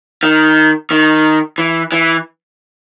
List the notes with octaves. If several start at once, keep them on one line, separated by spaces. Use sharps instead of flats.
D#3
D#3
E3
E3